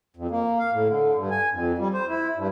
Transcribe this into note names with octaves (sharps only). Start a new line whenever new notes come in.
F2
A#3
F5
A2
D3
G2
G#5
F2
G3
C5
E4
G2